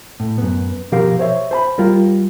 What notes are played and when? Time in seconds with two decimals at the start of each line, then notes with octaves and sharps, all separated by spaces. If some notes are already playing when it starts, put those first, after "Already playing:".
0.20 A2
0.38 F#2 B3
0.92 B2 F3 G4 A#4 F5
1.19 C5 C#5 E5
1.51 C5 A5 B5
1.78 G3 F4 A#4